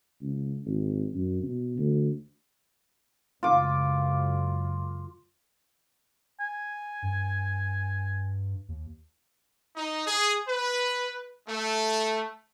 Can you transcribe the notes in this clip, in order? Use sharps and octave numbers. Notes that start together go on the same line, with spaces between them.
C#2
G#1
F#2
B2
D2
C#2 F#2 F4 D6
G#5
G2
D#2
D#4
G#4
B4
A3